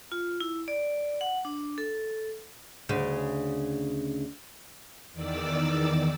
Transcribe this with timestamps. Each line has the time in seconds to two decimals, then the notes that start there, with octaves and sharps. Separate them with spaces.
0.12 F4
0.41 E4
0.68 D5
1.21 F#5
1.45 D4
1.78 A4
2.89 D2 C#3
5.13 E2 D#3 D5 D6 E6